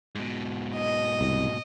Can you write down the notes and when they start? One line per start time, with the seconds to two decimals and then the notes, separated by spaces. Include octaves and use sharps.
0.15 G#2 B2
0.75 D#5
1.21 C2